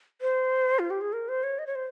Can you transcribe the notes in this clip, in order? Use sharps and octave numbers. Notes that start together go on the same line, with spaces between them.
C5
F4
G4
G#4
A#4
C5
C#5
D#5
C#5
C5